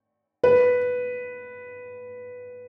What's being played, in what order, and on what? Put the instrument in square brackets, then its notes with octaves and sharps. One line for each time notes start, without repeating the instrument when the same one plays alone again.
[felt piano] B4